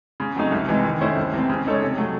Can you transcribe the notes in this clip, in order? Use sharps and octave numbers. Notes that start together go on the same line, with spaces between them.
C#3
F#3 A3 C4 D#4
C2
C3 E3 G#3
D#3
A3 C#4 E4 C5
C2
C3 E3 C4
C#3
G#3 D#4 A4 C#5
C3
F#3 A3